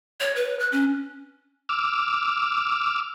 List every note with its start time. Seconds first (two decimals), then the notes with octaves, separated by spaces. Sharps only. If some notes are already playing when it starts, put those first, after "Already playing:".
0.20 C#5
0.36 B4
0.59 F#6
0.72 C#4
1.69 D6 E6 F6